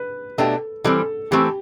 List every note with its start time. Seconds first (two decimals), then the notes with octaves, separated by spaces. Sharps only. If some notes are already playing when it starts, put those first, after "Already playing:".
Already playing: B4
0.38 B2 A3 D4 G4 A4
0.84 E3 G3 C4 A4
1.31 E3 A3 C4 G4